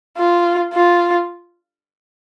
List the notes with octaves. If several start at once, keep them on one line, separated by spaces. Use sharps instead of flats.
F4
F4